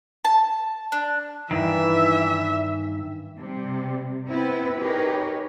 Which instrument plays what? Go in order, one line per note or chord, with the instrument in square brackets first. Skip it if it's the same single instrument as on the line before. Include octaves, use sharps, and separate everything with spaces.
[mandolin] A5
D4
[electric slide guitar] G2 D#3 [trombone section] E3 [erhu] E5
[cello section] C3 G3
B3 C4 E4 B4
D#4 G4 G#4 A#4 B4 C#5